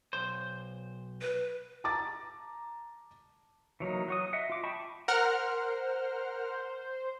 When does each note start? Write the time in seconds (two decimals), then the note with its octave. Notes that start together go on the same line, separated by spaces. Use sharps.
0.13 B1 C5
1.21 B4
1.84 A5 A#5 D6 A6
3.80 E3 F#3 A#3 D#4
4.08 F#3 F#4 D#6
4.33 D#5 E5 F#5
4.50 F4 D6
4.63 D#5 G5 A5 B5 C#6
5.08 A#4 C5 F#5 F6